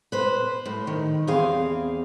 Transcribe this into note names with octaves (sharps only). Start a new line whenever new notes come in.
B4 C5
A2
D#3
E2 C4 G#4 F5